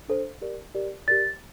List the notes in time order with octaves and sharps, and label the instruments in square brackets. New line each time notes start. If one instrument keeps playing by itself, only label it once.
[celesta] D4 A4 C5
G4 A#4 D5
G4 A#4 D5
G4 A#4 D5 A6